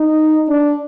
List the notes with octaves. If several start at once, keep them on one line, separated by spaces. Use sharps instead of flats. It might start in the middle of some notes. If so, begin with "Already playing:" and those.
Already playing: D#4
D4